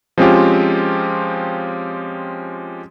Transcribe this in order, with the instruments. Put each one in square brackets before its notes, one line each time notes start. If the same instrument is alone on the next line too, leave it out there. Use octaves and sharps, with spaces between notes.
[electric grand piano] F3 G#3 C4 C#4 F4 G4